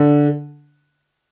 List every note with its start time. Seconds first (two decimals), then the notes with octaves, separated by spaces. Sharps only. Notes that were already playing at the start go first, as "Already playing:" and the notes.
Already playing: D3